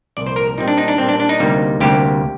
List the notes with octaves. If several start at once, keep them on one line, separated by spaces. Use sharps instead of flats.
C2 A#2 F3 D5
C5
A#4
A#2 G3 C4 D#4
D4
D#4
D4
A#2 G3 C4
D4
D4
D#4
D2 C3 G3 A#3
D2 C3 G3 A#3 G4